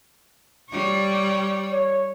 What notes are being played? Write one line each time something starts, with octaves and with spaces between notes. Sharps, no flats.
G3 C#5
C#5